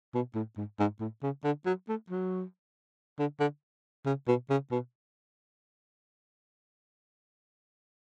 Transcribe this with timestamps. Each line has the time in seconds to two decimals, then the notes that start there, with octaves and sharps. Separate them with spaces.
0.14 B2
0.35 A2
0.57 G#2
0.80 G#2
1.00 A2
1.23 C#3
1.44 D3
1.66 F#3
1.88 A3
2.10 F#3
3.19 D3
3.40 D3
4.06 C#3
4.28 B2
4.50 C#3
4.71 B2